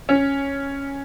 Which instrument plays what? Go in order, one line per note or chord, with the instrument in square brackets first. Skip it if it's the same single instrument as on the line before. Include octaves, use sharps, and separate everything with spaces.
[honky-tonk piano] C#4